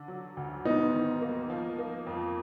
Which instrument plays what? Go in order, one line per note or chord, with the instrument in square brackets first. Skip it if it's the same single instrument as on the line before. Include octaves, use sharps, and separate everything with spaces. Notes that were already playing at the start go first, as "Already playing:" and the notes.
Already playing: [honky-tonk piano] D3
F#3
D2
[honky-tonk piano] G#2 [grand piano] B3 D#4
[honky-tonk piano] D#3
A#3
F3
A#3
F2